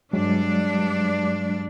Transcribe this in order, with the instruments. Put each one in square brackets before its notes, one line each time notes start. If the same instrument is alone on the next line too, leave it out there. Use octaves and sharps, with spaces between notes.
[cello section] G2 D4 [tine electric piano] F#3 G#3